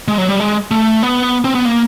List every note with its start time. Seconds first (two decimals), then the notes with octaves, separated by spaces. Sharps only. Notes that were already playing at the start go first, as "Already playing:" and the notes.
0.08 G#3
0.18 F#3
0.28 G3
0.40 G#3
0.71 A3
1.03 B3
1.44 C4
1.55 B3
1.65 A#3